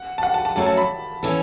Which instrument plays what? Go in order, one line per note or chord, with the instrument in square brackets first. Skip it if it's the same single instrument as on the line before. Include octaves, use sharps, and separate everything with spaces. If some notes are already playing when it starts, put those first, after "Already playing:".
Already playing: [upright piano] F#5
A5
F#5
A5
A5
[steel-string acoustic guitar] F#2 F#3 A3 F#4 [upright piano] A5
[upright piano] A5
B5
[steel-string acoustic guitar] E3 C#4 A4